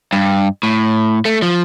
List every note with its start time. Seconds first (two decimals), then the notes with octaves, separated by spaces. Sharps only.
0.13 G2
0.63 A2
1.25 A3
1.42 F3